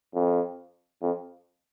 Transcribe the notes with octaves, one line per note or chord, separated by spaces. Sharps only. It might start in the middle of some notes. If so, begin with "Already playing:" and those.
F2
F2